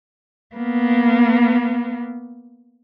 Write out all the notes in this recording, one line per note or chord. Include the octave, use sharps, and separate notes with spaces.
A#3 B3